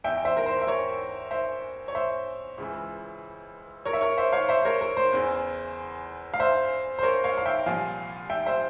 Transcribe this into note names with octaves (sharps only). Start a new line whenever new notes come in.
E2 E3 E5 G5
C5 E5
A#4
C5
E5
A#4 C#5
C5 E5
C#5
C5 E5
C#2 C#3 E3
A#4 C#5
E5
A#4 C#5
C5 E5
C#5 F5
C5 E5
A#4 C#5
A#4
C5
E2 C#3 E3
F5
C5 E5
C5
A#4 C#5
C#5 F5
F5
E5 G5
C2 A#2 F3 F5 G#5
E5 G5
C5 E5